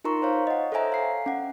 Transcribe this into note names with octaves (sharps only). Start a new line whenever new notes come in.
D#4 F4 A#4 A#5 C6 C#6
C5 C#5 F5
D#5 F#5
A4 C5 C#5 E5 G#5 A#5
F5 C7
C#4 F#5